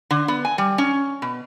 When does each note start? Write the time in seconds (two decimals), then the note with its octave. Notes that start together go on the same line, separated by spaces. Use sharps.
0.11 D3
0.28 B3
0.45 G#5
0.58 G3
0.78 C#4
1.22 B2